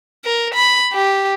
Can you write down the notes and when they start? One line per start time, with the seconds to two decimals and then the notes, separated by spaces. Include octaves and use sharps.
0.24 A#4
0.54 B5
0.92 G4